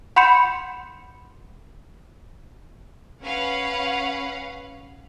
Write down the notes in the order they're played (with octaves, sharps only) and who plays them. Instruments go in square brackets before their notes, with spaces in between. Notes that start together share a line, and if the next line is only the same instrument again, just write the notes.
[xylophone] F#5 B5 C6 G6 C#7 E7
[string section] C#4 B4 F5 F#5